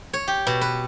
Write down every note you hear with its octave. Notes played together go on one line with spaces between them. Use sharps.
C#5
G4
B2
B4